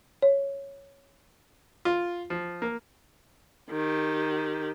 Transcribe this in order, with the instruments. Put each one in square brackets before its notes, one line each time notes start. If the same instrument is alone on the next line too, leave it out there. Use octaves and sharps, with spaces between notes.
[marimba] C#5
[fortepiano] F4
F3
A#3
[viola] D#3 G4